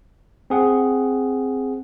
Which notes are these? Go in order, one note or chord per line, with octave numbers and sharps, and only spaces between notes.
C4 G#4 F#5